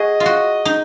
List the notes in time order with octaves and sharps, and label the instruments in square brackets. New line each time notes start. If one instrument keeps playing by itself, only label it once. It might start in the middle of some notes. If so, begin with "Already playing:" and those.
Already playing: [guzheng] F#4 G#4 [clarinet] D#5
[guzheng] F4
F#4
D#4